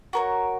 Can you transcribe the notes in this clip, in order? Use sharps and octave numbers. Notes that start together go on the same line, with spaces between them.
F#4 A#4 C#5